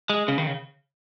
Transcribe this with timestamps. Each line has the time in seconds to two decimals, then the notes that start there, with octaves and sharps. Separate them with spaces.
0.10 G#3
0.28 C#3
0.38 D#3
0.47 C#3